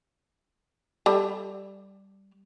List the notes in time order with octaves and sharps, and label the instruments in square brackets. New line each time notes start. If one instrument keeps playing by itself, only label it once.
[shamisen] G3 A4